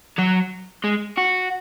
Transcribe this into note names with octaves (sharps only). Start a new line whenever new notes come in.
F#3
G#3
F#4